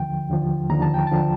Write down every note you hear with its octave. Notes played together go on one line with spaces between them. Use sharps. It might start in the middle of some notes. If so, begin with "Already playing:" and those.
Already playing: D#2 D3 F3 G5
D#2 D3 F3
D#2 D3 F3 A#5
A5
G5
D3 F3 A5